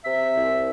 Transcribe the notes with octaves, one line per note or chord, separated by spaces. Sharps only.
C3 E5
C2